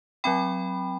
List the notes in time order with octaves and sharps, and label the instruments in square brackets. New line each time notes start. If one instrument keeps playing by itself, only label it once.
[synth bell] F#3 C4 G5 B5